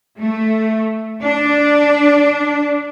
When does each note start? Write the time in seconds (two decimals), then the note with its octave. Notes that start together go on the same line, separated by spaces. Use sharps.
0.20 A3
1.22 D4